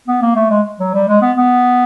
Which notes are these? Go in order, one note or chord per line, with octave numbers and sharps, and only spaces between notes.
B3
A#3
A3
G#3
F#3
G3
G#3
B3
B3